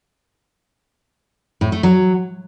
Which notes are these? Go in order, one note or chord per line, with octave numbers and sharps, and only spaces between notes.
A2
A3
F#3